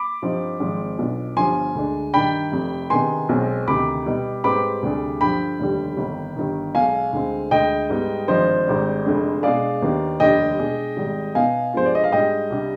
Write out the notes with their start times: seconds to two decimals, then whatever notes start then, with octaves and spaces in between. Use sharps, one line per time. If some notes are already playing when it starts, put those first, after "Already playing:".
Already playing: B5 D6
0.22 G2 F3 C4 D#4
0.60 G#1 G#2 F3 G#3 C4
0.98 B1 B2 B3 D4 F4
1.37 G1 G2 F3 G#5 C6
1.75 D2 D3 G#3 D4
2.13 G2 D#3 G3 D4 G5 B5
2.52 F1 F2 C3
2.90 C3 D#3 B3 D4 G#4 G#5 C6
3.29 B1 B2 G#3 C4
3.67 D2 C3 D#3 B5 D6
4.06 B2 G3 B3 D#4
4.44 G#2 G3 C4 G4 B4 B5 D6
4.82 D2 C3 G3 D4 G#4
5.21 G2 D3 F3 G5 B5
5.60 F1 D#2 D3 G3
5.97 G1 F2 D#3
6.36 G1 G2 D#3
6.75 B1 B2 G#3 F5 G#5
7.12 D2 D3 G#3 C4
7.51 D2 D3 G#3 D#5 G5
7.90 G#2 G3 B3 D#4
8.28 G#1 G2 D3 F3 C5 D#5
8.67 G#1 G#2 G3 D4
9.05 F1 F2 D3 G#3 D4
9.43 B2 G#3 D4 G#4 D5 F5
9.82 D#2 D#3 B3 D4
10.20 F1 D#2 D3 G3 D4 D#5 G5
10.58 B2 G#3 D4 G#4
10.97 G#1 G#2 G3
11.35 B2 B3 D#4 F5 G#5
11.73 G2 F3 G#3 B3 F4 C5
11.86 D5
11.95 D#5
12.04 F5
12.12 G#2 G3 D4 G#4 D#5 G5
12.50 C2 C3 G3 D4 G4